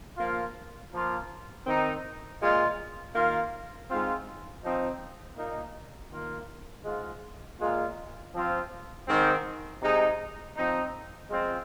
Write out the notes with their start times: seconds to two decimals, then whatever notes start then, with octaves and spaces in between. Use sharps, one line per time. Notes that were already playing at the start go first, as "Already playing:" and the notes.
0.16 F3 A#3 F4
0.91 F3 A#3 F4
1.65 D#3 C4 D#4
2.39 A#2 G#3 F4
3.14 D#3 A#3 F4
3.88 G#2 G#3 C4 F4
4.62 F3 C4 D#4
5.36 A#2 A#3 D#4
6.11 D#3 A#3 F4
6.84 G#2 G#3 F4
7.59 A#2 G#3 F4
8.32 F3 C4 F4
9.07 G#2 D#3 C4 D#4
9.81 C3 G#3 D#4
10.56 F3 C4 D#4
11.29 F3 G#3 C4 F4